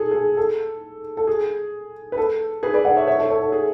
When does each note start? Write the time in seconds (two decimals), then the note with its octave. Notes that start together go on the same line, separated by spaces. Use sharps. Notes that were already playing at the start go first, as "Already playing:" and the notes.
Already playing: G#4 A4
0.11 G#4
0.37 A4
1.17 A4
1.27 G#4
2.12 B4
2.18 A4
2.63 G#4 B4
2.74 B4 D5
2.85 D5 F#5
2.97 C#5 E5
3.07 C#5 E5
3.19 A4 C#5
3.30 A4 C#5
3.42 A4
3.52 G#4